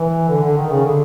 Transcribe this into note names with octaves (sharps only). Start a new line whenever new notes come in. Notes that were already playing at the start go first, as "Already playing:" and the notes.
Already playing: E3
D3
D3
D#3
C#3
D3